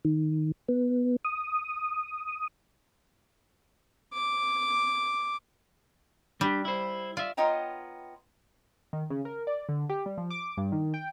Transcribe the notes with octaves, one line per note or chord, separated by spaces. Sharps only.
D#3
B3
D#6
D6
G3 D4 G4
E4 C5
F4 D5 E5
B3 F4 C#5 D#5 G5 A#5
D#3
C#3
A#4
D5
D3
G4
G3
F3
D6
G2
D#3
G5